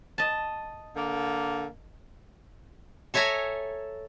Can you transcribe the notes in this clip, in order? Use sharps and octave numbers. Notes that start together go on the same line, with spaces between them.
D#5 A5
D3 A#3
A4 C#5 E5 G#5 A#5